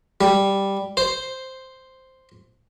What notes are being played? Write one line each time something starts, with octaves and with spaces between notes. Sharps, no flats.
G3
C5